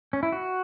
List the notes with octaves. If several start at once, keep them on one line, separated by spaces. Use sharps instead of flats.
C#4
E4
F#4